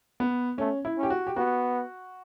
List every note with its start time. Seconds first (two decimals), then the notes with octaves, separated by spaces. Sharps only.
0.20 B3
0.58 A3 C#4
0.85 E4
0.98 C#4
1.03 G4
1.10 F#4
1.27 G4
1.36 B3 F#4